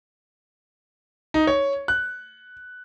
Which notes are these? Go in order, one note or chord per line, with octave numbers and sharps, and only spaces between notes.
D#4
C#5
F#6